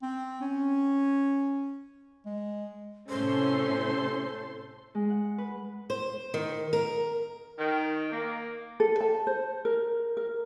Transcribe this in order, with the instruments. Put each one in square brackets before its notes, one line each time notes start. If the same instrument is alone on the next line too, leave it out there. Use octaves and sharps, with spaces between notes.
[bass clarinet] C4
C#4
G#3
[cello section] A2 C3 C#4 [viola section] A4 C6 [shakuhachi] C5
[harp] G#3
F#5
B4
[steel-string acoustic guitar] C5
D#3
A#4
[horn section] D#3
A#3
[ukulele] A4
A5
C5
A#4
A#4